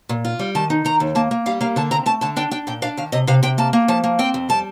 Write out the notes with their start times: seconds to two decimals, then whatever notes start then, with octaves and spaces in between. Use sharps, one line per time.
0.09 A#2
0.25 F4
0.39 G3
0.55 D#3 A5
0.70 D#4
0.85 D#3 A#5
1.00 D#2
1.15 A#3 A5
1.31 A#3
1.46 G3 F5
1.61 A#3 F5
1.76 D3 A5
1.91 C4 A#5
2.06 A3 A5
2.21 D3 A5
2.37 D4 G5
2.51 D4 G5
2.67 A#2 G5
2.82 D4 F5
2.97 D#3 F5
3.12 C3 D#5
3.27 C3 F5
3.43 C3 G5
3.58 A#3 A5
3.73 A#3
3.88 F3 A5
4.04 A#3
4.19 C4 G5
4.34 F2
4.49 G3 A5